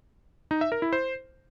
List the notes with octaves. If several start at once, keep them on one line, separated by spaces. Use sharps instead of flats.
D#4
E5
A#4
E4
C5